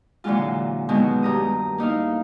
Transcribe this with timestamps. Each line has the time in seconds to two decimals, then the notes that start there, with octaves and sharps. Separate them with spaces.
0.24 A#2 D3 E3 F#3 G#3 F4
0.89 B2 D#3 F#3 G#3
1.23 G2 A#5 D#6
1.78 A#3 D#4 E4 F5